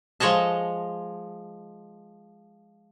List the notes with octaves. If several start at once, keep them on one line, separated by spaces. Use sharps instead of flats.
F3 G#3 C#5 D#5 A5